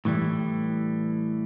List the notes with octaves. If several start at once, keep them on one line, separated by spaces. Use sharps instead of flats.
A2 E3 G3